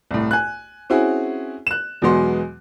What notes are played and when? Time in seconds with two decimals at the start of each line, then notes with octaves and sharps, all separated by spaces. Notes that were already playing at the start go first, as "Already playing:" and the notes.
0.11 C2 A2
0.31 G#5 F#6
0.90 C4 C#4 E4 F#4 G#4
1.67 F#6 E7
2.02 E2 B2 F#3 G#3 B3 C6